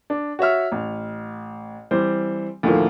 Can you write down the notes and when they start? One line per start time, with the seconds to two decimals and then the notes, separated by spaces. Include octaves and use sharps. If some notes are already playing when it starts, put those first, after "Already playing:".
0.10 D4
0.39 F#4 C#5 E5 F6
0.72 A1
1.91 E3 G3 C4 C5
2.63 D2 A2 D#3 F3 A#3